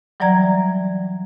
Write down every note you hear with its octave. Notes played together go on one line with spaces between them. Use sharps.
E3 F#3 G3 D5 A#5 G#6